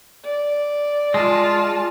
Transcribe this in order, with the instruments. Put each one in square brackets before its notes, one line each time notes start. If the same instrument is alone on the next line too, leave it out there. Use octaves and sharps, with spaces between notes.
[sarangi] D5
[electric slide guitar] G#3 [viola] F4 [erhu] A5